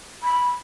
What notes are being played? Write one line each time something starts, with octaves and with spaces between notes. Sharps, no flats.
B5